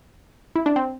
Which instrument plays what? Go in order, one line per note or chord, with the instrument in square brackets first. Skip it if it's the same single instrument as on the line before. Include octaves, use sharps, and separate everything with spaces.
[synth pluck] E4
D4
C4